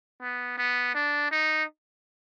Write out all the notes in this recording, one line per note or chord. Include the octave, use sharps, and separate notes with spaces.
B3
B3
D4
D#4